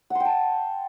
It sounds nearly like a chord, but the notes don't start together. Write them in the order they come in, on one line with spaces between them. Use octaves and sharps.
F#5 C6 G5 A5